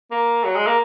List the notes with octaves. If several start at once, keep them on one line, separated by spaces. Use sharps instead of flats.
A#3
F#3
G#3
A#3